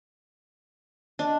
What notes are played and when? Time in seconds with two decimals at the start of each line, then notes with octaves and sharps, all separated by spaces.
1.19 D4 D#5